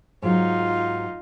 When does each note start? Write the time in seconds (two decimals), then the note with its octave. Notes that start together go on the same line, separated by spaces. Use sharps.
0.22 G#2 F#3 D#4 F4